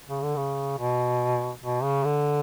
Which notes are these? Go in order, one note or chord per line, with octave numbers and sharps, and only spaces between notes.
C#3
D3
C#3
B2
B2
C#3
D3